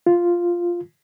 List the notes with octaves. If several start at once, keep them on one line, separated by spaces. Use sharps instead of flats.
F4